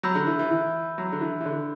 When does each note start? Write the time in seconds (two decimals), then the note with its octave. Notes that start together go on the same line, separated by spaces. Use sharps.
0.03 F#3 B5 E6 G6
0.15 D3
0.27 E3
0.39 E3
0.51 E3
0.98 F#3
1.12 D3
1.21 E3
1.41 E3
1.45 D3